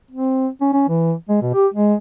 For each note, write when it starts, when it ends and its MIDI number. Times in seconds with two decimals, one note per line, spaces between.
0.11 0.48 60
0.61 0.68 61
0.73 0.86 61
0.89 1.13 52
1.29 1.39 56
1.42 1.52 47
1.54 1.67 67
1.74 1.95 56